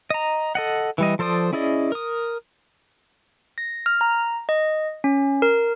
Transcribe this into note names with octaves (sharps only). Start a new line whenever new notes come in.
D#5 A#5
A4 D#5 F#5
E3 G3 D#5
F3 A4 C5 D5 D#6
C#4 E4 G#4 D5 D#5
A#4 D#6
A#6
F6
A#5
D#5
C#4
A#4